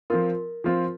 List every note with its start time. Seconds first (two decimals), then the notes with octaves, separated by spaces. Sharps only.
0.10 F3 C4 F4 A#4
0.64 F3 C4 F4